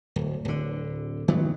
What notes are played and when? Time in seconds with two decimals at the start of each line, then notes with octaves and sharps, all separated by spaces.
0.16 D1
0.45 D1 D3
1.28 D#3 E3 F#3 B3